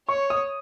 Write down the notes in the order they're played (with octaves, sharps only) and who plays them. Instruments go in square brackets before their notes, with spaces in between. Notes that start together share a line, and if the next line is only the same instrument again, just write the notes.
[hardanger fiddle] C#5 [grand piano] C#6
[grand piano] D#6